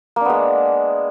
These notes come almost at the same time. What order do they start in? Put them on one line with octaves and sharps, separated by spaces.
A#3 D4 B3 G#3